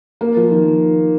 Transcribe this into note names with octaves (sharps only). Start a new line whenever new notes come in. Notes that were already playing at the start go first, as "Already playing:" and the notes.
A#3
F3
D#3